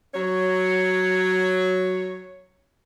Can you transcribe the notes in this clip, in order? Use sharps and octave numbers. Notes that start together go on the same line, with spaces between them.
F#3 C#5